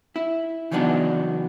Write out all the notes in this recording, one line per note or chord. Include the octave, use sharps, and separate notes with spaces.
E4
C#3 E3 F#3 B3 D4 D#4